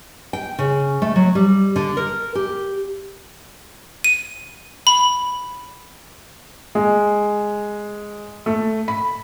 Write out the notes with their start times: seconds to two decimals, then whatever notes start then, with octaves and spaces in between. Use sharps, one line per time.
0.33 G5
0.59 C#3
1.02 A3
1.16 F#3
1.35 G3
1.76 D3
1.97 A#4
2.35 G4
4.04 D#7
4.87 B5
6.75 G#3
8.46 A3
8.88 B5